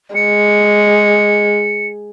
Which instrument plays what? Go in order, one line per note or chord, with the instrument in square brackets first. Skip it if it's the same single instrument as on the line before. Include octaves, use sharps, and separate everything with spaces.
[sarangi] G#3 [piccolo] C#7